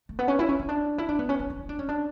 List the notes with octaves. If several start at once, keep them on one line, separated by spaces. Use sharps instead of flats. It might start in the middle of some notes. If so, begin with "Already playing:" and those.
A3
B3
C#4
E4
C#4
C#4
D4
E4
D4
B3
C#4
D4
D4
E4
D4
C#4
D4